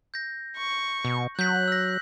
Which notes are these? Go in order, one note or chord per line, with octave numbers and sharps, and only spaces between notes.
G6 A#6
C#6
B2
F#3 F#6 G6 B6
E6 A#6